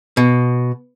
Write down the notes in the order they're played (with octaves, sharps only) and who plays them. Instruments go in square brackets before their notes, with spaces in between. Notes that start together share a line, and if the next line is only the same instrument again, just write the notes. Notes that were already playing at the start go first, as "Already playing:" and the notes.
[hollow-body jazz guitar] B2